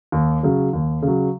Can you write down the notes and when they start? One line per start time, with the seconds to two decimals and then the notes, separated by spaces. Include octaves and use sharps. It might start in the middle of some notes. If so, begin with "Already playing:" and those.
0.12 D#2
0.43 C#3 F#3
0.73 D#2
1.02 C#3 F#3